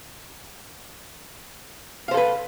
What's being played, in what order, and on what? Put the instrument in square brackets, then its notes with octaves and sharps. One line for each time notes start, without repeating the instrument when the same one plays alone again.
[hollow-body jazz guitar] F5
C5
A4
B4